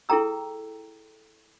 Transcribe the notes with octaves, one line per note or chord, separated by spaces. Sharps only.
E4 G#4 A4 G5 A#5 E6